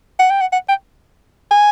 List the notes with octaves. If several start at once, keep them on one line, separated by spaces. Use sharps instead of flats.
F#5
G5
F#5
F#5
G5
G#5